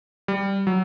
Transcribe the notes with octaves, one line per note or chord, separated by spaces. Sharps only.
G3
F#3